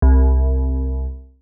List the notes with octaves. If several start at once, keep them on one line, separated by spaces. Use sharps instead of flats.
C2